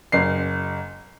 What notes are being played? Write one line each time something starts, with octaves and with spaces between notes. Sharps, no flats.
F#1 C7